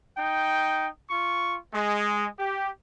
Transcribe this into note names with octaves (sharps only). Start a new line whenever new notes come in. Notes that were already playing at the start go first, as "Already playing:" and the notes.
D#4 G5
F4 C#6
G#3
G4